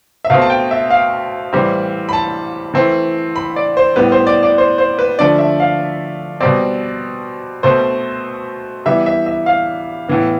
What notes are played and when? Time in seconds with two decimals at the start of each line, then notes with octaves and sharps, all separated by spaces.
0.25 E5
0.30 B2 A3 C4 F5
0.41 A5
0.50 G5
0.71 E5
0.90 F5
1.53 A2 E3 G3 C4
2.09 B5
2.13 A5
2.74 E3 A3 C4
3.36 B5
3.56 D5
3.77 C5
3.96 A2 G3 B3 B4
4.12 C5
4.27 D5
4.43 D5
4.58 C5
4.78 C5
4.99 B4
5.19 D3 F3 A3 D5
5.39 E5
5.60 F5
6.40 B2 G3 C4 D5
7.63 B2 A3 C4 C5
8.86 E3 G3 B3 E5
9.06 E5
9.26 E5
9.46 F5
10.08 A2 E3 B3